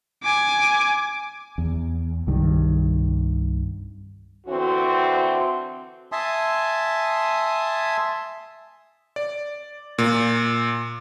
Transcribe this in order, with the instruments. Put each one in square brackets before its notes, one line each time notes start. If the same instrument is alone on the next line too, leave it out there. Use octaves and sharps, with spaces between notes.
[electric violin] G#5 D6
[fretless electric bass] E2
C2 G2 D#3
[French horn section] D3 E3 C4 F#4
[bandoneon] E5 G#5 A5 C6 D#6
[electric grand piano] D5
A#2